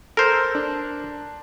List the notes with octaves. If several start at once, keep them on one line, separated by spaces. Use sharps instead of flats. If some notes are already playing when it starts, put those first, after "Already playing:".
A4 A#4 C5
D4